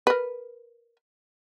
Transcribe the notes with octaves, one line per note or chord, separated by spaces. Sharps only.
A#4 B4